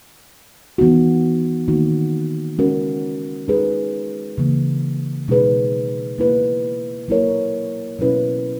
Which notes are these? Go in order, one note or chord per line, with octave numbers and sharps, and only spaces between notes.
E3 B3 D#4 F#4
D#3 A#3 D#4 F#4
G#3 C#4 F#4 A#4
G#3 D#4 G#4 B4
C#3 E3 A#3
B2 G#3 D#4 G#4 B4
A#3 E4 B4
F#3 A#3 E4 A#4 C#5
B2 F#3 C#4 E4 B4